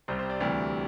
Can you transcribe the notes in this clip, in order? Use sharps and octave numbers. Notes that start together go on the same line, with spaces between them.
C2 C3 G3 C5
C5
D5
D2 C3 E3 G3